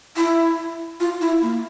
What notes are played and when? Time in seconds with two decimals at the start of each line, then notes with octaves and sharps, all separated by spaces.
0.17 E4
1.00 F4
1.21 E4
1.42 A#3